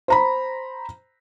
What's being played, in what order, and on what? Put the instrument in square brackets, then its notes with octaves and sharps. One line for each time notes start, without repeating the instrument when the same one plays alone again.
[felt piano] C5 A#5 B5